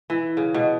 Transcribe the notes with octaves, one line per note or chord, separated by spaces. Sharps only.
E3
C#3
B2